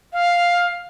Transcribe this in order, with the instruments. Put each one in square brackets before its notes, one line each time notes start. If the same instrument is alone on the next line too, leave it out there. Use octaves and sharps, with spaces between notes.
[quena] F5